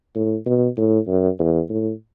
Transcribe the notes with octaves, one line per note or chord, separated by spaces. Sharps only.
A2
B2
A2
F#2
E2
A2